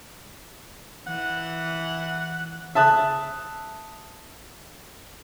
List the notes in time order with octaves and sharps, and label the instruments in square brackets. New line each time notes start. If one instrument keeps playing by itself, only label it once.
[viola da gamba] E3 [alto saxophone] F#5
[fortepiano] E5 A5 D#6 F#6